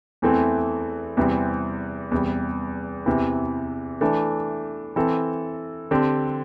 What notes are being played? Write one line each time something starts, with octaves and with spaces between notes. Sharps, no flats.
E2 E3 A3 C4
E2 C3 E3 G3 C4
E2 C3 G3
E2 C3 E3
E3 A3 D4
E3 C4 A4
D3 C4 G4